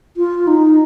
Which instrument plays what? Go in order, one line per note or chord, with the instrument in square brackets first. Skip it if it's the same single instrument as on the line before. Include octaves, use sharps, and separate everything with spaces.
[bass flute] F4
D#4